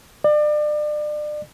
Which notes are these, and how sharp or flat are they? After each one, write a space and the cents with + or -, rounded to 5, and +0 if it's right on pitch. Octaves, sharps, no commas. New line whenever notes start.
D5 +35